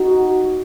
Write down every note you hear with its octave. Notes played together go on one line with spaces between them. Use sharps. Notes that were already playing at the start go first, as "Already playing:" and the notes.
Already playing: D#4 F#4